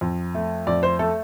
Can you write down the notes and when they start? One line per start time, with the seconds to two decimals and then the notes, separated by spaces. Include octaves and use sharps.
0.01 F2
0.35 A3
0.67 F2 D5
0.83 C5
0.99 A3 A4